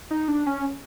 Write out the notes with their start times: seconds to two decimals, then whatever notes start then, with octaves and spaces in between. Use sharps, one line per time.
0.11 D#4
0.28 D4
0.47 C#4